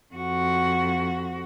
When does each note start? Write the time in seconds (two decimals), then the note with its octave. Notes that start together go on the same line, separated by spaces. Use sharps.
0.14 F2 F#4